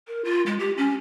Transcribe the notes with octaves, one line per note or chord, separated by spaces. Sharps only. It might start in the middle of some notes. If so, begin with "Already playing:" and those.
A#4
F4
G#3
G4
C#4